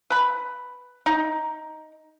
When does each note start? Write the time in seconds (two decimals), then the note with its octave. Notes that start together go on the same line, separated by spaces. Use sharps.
0.10 B4 B5
1.06 D#4